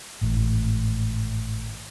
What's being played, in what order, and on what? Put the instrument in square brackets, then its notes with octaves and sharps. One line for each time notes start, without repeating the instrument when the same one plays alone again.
[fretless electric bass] G#1 A2 E3